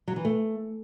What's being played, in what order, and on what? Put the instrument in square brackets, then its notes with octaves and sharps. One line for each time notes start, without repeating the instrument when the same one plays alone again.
[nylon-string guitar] F#3
E3
A3